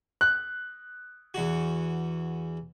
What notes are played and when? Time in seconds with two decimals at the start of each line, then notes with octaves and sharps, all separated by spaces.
0.21 F#6
1.34 E2 F#4